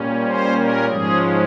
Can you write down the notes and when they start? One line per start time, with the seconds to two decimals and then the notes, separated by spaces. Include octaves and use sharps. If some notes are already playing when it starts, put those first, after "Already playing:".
Already playing: A#2 G3 C#4
0.24 C5
0.56 A#4
0.89 G#2 F3 G#3 C#4 G#4